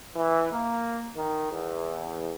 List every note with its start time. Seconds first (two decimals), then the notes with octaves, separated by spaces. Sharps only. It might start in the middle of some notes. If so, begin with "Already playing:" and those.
0.16 E3
0.52 A#3
1.16 D#3
1.52 E2